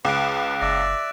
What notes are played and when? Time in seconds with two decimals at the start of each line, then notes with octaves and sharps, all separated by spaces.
0.05 C#2 B4 D6 F#6 D7
0.61 F#1 D5 E5 A#6 D7